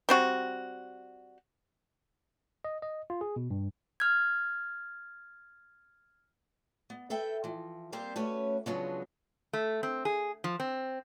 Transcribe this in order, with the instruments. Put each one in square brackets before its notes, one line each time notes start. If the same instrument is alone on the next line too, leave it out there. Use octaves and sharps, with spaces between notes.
[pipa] G3 C4 F#4
[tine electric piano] D#5
D#5
F4
G#4
B2
G2
[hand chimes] F6 G#6
[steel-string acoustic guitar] B3
A4 B4 E5 G5
E3 F3
G3 A#3 C4 G4 C5
A3 C#4 F#4 B4 C#5
C#3 F3 F#3 G#3 B3 D4
[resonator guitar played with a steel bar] A3
C4
G#4
F3
C4